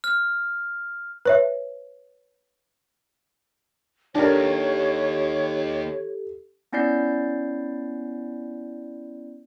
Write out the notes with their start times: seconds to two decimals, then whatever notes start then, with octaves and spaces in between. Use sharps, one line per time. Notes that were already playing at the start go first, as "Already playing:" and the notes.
0.04 F6
1.25 B4 C#5 E5
4.15 D#2 D4 G4 A4 A#4 C#5
6.72 B3 C#4 E4 D5 G6 C7